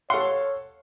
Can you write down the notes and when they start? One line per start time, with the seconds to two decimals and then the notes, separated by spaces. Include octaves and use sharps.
0.10 A4 C#5 F5 F#5 C6